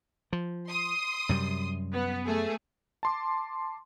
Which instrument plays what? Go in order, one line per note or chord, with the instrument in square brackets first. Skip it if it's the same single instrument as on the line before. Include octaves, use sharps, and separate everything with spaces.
[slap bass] F3
[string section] C6 D#6
[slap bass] F#2 C3 G3
[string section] B3
A3 G#4
[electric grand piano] A5 C6 D6